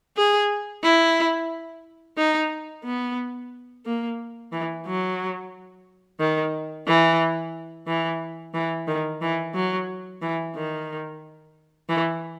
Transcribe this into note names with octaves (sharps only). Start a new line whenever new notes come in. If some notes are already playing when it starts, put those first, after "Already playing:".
G#4
E4
D#4
B3
A#3
E3
F#3
D#3
E3
E3
E3
D#3
E3
F#3
E3
D#3
E3